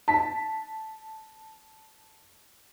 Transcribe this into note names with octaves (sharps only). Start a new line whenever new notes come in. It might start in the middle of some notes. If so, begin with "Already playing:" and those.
A5 B6